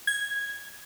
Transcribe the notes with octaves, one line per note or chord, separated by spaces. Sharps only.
G#6